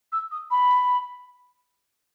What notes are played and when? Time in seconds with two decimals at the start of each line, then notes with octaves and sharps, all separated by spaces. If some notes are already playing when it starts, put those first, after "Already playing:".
0.12 E6
0.31 D#6
0.51 B5